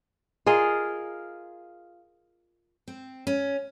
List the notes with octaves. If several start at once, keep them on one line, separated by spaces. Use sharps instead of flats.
F4 G#4 A#4 D#5
C4
C#4